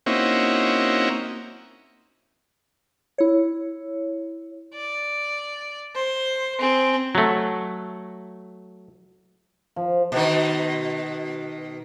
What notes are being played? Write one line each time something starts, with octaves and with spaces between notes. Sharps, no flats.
A#3 C4 C#4 D#4 E4 F#4
E4 C#5
D5
C5
C4 G#4
F#3 A3
F3
B2 D#3